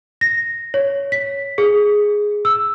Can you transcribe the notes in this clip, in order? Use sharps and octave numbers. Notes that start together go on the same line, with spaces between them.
A#6
C#5
B6
G#4
E6